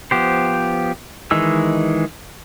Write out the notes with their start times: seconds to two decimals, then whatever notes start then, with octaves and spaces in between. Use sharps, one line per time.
0.11 F3 B3 G4 C5
1.31 D#3 E3 G#3 E6